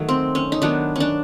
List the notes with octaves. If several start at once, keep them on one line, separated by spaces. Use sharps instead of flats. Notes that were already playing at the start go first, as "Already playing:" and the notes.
Already playing: D#3 F#3 A3
C4
C#4
D#4
D#3 F#3 B3 D4
C#4 D4